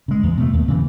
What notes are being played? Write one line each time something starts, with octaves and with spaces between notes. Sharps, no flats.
C#3 G#3
E2
B2 A3
D#2
C#3 E3